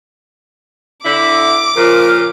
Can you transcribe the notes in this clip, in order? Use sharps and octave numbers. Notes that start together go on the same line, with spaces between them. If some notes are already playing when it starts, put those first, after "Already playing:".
D3 E4 D6
A#2 C#3 F3 A#4